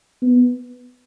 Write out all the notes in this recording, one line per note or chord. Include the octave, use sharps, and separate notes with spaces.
B3